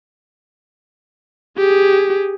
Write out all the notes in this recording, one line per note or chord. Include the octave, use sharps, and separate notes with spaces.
G4 G#4